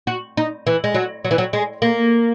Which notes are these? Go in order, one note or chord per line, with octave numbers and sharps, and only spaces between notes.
F#4
D#4
E3
G#3
F#3
F#3
E3
F#3
G#3
A#3